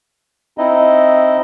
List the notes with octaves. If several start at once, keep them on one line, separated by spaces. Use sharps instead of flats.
C4 D#4 E4 D#5